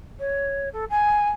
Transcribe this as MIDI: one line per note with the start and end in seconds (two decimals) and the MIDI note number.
0.19 0.69 73
0.73 0.85 69
0.90 1.29 80